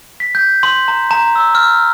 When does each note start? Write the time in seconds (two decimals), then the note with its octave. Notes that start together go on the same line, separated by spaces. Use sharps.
0.20 B6
0.35 G6
0.63 C6
0.88 A#5
1.11 A#5
1.36 E6
1.55 F6